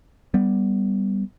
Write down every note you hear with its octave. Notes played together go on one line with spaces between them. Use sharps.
G3 B3